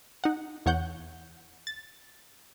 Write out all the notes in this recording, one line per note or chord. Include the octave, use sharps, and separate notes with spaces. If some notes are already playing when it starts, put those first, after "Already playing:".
D#4 F#5
E2 C#5 F#5 G6
A6